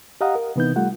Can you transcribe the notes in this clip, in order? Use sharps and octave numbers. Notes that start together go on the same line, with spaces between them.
G4 D#5 F5 F#5 A#5 D#6
A#4
C3 E3 B3 D#4 G6
G3 A3 F4 F#5